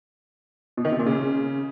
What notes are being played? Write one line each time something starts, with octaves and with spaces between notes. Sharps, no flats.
B2
D#3
C3
A#2
C#3